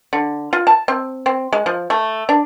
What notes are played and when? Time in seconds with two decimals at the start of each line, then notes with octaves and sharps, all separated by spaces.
0.13 D3
0.53 F4
0.67 A5
0.88 C4
1.26 C4
1.52 G#3
1.66 F3
1.90 A3
2.29 D4